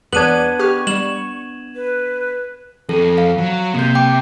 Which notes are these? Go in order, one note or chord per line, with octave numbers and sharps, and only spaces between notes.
E2 B3 D4 G#6 D#7 F#7
G4 C#6 F6
G3 E7 F#7
B4
F2 A4
F5
F#3
C3 A#3 G6
G5 D6